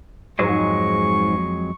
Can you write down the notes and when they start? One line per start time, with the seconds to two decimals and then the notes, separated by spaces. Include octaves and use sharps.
0.39 F2 G#2 F#3 G#3 C#6